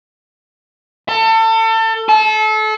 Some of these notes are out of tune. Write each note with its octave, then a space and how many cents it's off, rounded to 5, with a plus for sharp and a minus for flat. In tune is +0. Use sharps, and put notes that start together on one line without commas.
A4 +30
A4 -30